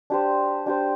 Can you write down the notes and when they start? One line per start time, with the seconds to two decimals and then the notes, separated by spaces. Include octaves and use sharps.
0.10 D4 G4 C5
0.66 D4 G4 C5